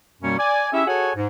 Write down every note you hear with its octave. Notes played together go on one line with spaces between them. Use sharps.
F#2 B2 G3 A#3 C#4
D5 G#5
C#4 E4 G4 G#4 E5
F#4 G#4 A4 C#5 F#5 G#5
G#2